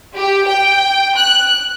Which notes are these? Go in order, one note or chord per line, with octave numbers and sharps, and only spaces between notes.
G4
G5
F#6